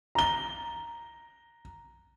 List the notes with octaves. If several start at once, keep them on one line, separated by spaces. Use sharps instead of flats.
A#5 G7